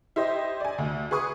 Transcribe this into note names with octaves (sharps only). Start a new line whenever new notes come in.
E4 G4 C5 D#5
D5 G#5
D2
G#4 B4 C#6 D#6